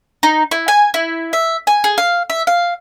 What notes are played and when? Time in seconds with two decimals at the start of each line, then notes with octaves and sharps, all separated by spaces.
0.23 D#4
0.51 E4
0.68 G#5
0.94 E4
1.33 E5
1.67 G#5
1.84 G#4
1.98 F5
2.30 E5
2.47 F5